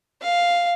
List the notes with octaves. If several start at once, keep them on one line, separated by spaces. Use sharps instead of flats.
F5